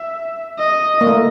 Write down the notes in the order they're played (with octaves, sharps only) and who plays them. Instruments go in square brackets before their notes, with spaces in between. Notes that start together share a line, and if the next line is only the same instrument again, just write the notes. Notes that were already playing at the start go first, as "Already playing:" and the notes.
Already playing: [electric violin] E5
D#5
[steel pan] A#3
A3